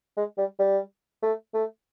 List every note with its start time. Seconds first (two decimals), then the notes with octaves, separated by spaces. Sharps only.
0.17 G#3
0.38 G3
0.59 G3
1.23 A3
1.54 A3